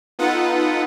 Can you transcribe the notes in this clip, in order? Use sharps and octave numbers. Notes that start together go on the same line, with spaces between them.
B3 D#4 F4 A4 B4 F#5